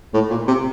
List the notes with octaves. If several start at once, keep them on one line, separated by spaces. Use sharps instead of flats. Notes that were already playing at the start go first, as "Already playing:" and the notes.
A2
A#2
C3